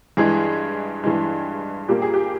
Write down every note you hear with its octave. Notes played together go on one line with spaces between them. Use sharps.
G2 E3 G#3 G#4
G2 E3 G#3
A#2 G3 A#3 G4
G#4
G4